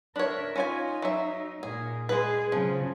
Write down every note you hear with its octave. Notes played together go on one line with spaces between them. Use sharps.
D4 A#4 C#5 E5
C#4 D#4 F4 G#5
F#3 E5
A#2 G#4
G#3 G#4 B4
C#3 F3 F#3